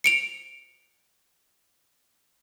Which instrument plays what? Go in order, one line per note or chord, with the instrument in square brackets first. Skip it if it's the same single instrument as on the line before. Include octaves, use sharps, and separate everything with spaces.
[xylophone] C#7 D7 F7